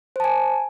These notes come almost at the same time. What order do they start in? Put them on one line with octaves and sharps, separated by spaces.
C5 A5 G#5